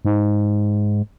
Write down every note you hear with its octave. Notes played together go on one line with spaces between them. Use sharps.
G#2